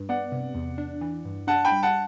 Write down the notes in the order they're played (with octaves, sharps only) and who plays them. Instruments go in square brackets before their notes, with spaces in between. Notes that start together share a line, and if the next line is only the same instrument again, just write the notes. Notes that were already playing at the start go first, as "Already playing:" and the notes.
Already playing: [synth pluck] G2
[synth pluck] B3 [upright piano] D5 F#5
[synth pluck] C3
E2
D4
E3
G2
[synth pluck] D4 [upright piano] F#5 A5
[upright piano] G5 B5
[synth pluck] G3
[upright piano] F#5 A5